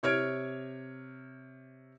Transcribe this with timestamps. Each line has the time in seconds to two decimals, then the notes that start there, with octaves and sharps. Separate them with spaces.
0.03 C3 C#5 F6 G#6 D7